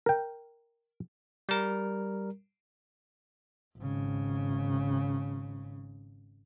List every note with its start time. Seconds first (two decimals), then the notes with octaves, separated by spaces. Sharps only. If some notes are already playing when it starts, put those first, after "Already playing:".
0.06 A#4 G5
1.49 G3 A#4
3.77 G#1 C#3